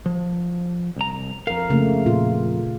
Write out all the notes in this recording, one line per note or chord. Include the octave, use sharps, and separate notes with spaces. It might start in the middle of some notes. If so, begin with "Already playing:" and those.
F3
C2 A#5
F2 A#4 F5
C#3 A3 A#3
A#2 F4